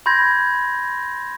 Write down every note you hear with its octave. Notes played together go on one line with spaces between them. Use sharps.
B5 C6 G6 G#6 A#6